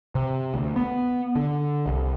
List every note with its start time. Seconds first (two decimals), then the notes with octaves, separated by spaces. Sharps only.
0.15 C3
0.54 D2
0.76 B3
1.36 D3
1.86 C2